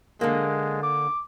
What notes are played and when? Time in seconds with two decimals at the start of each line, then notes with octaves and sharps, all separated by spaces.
0.21 D3 G#3 A#3
0.83 D6